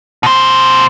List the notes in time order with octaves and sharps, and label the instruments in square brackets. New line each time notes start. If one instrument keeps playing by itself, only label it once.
[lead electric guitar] B2 C5